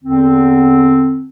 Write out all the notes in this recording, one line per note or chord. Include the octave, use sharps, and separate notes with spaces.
E2 D3 C4